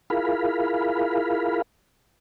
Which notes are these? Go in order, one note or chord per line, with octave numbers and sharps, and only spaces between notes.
E4 F4 G#4 A#4 F5 B5